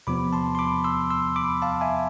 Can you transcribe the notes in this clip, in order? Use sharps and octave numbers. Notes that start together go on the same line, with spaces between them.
E2 C3 F3 B3 B5 D6
A5 C6
C6
B5 D6
C6 E6
C6 E6
B5 D6
F5 A5
E5 G#5